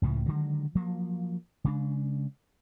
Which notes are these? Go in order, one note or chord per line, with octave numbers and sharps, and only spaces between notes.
C#2 A2 C#3 F3
D3 D#3 F#3 G#3
F3 F#3 A#3
C#3 G#3 D4